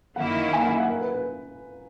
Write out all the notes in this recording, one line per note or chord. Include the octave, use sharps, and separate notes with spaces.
F#2 D#3 A#3 E4 F#5
G#5
F#5
E5
F#5
A#4
B4
B4